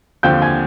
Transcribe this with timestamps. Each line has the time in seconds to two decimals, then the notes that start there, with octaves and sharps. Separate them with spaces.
0.23 D#2 D3 F3 C4 F4 G5 G6
0.42 G#5 G#6